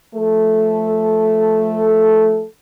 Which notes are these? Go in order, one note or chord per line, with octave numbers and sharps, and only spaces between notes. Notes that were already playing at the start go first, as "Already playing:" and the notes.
F3 A3 A4